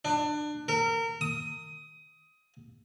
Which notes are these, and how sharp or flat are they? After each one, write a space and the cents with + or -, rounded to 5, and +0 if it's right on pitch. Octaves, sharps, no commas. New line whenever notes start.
D4 +25
A#4 -25
D#6 +20